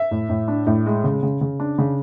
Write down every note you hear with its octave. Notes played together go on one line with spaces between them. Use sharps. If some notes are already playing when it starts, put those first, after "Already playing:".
Already playing: E5
A2
A2
D4
A2
G#3
C#3
C#3
C#3
D4
C#3